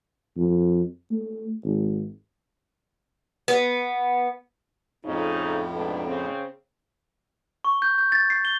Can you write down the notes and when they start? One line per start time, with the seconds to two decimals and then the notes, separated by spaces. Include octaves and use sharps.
0.37 F2
1.11 A3
1.64 G#1
3.48 B3
5.05 F2 A2 C#3 F3 D#4
5.74 G#2 B2 D4
6.07 C#3 C4
7.65 C#6
7.82 G6
7.98 G6
8.12 A6
8.30 C7
8.45 G7